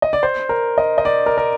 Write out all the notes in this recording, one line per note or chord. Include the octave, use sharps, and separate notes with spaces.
D#5
D5
C5
A#4
D#5
D#5
D5
A#4
A#4